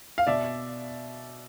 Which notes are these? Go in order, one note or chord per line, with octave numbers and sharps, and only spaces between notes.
F5
B2 D5 E5